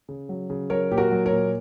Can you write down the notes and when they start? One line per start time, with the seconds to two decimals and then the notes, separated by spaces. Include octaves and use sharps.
0.09 C#3
0.29 F#3
0.50 C#3
0.70 F#3 A#4 C#5
0.91 A#2 G4
0.97 F#4 A#4
1.11 F#3
1.25 A#4 C#5
1.32 A#2